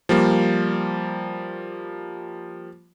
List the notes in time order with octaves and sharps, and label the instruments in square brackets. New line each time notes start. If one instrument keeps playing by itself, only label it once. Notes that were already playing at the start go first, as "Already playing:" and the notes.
[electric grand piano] F3 G3 A#3